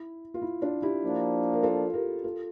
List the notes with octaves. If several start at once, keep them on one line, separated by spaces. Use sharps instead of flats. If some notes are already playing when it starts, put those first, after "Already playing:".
Already playing: E4
F4
E4
D4 F4
E4 G4
F3 A#3 D4
A#4
F4 A4
G4 A#4
F4 A4